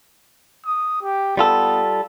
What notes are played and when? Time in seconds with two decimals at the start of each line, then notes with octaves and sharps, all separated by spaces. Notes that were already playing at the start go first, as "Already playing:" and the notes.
0.65 D#6
1.02 G4
1.37 G3 B3 F4 A4